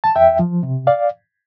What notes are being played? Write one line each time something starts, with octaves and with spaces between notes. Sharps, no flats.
A5
E2 E5 G5
F3
C3
D5 F5